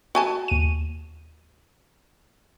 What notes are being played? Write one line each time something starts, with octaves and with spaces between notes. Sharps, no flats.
F#4 G#5 A5
D#2 D#7